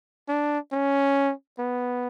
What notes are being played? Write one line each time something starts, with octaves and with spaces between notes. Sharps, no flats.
D4
C#4
B3